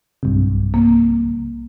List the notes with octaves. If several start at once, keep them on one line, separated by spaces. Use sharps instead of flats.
B1 G2 C3
A#3